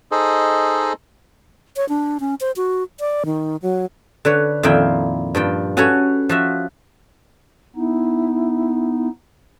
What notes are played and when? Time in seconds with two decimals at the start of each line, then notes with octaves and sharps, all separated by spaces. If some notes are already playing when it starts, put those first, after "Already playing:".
0.11 D#4 G#4 A4 C5 D#5
1.76 C#5
1.89 D4
2.20 C#4
2.41 C5
2.56 F#4
3.00 D5
3.26 D#3
3.62 F#3
4.25 D3 B4 C#5
4.63 F2 A#2 D#3 A#3 E4 G5
5.35 G2 F3 G5
5.77 C#4 F#4 A4 B4 C#5 G#5
6.29 F3 F#4 E5
7.76 B3 D#4 E4